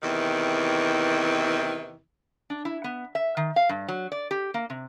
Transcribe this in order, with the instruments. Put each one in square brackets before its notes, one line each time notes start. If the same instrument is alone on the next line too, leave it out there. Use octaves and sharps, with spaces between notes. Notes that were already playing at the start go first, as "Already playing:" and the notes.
[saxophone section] E2 C3 D#3 E3
[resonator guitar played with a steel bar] D4
E4
B3
E5
D#3
F5
G2
F#3
D5
G4
A#3
C3